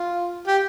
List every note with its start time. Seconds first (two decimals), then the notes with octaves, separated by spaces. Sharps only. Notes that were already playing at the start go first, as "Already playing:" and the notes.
Already playing: F4
0.47 G4